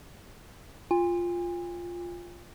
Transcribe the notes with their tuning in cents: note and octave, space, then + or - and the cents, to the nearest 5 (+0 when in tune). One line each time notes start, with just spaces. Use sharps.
F4 +0 G#5 -40